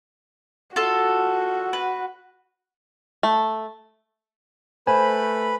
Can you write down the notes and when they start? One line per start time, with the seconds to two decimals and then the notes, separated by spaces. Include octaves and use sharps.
0.76 F4 F#4 A4
1.73 B4
3.23 A3
4.87 A3 B4 C5 G#5 B5